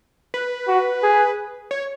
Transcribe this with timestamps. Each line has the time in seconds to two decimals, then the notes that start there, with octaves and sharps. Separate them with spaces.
0.34 B4
0.68 F#4
1.03 G#4
1.71 C#5